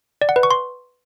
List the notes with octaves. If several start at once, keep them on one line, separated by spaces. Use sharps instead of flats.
D5
F#5
B4
C#6
C6